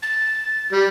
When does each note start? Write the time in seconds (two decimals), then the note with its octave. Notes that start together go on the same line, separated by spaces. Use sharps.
0.02 A6
0.72 G3